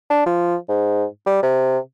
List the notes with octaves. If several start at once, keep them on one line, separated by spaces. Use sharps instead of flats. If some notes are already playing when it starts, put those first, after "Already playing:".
D4
F3
G#2
G3
C3